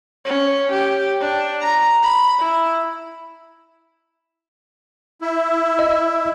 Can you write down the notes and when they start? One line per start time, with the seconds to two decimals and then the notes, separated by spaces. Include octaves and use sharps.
0.25 C#4
0.72 G4
1.21 D4
1.61 A#5
2.03 B5
2.39 E4
5.21 E4
5.79 D#5